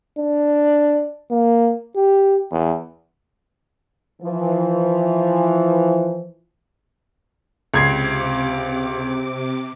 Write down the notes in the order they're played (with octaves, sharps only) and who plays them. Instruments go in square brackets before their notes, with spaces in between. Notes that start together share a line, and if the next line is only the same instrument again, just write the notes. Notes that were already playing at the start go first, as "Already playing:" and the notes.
[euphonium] D4
A#3
G4
E2
[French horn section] E3 F3
[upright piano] C#2 G#6 C7 [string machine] C3 D6